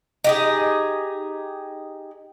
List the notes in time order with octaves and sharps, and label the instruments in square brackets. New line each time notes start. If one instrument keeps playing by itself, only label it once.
[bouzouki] D#4 G4 G#4